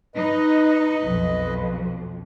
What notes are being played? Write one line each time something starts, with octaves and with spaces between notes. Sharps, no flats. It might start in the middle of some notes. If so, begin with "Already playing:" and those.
D#4 B4 D#5
B1 F2